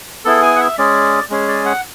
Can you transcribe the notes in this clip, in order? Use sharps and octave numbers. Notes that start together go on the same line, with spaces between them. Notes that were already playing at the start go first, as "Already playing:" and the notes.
B3 E4 G#4 A4
G#5
F#5
E5
G#3 C#4 G#4 D5
G#3 C#4 G#4
D5
F#5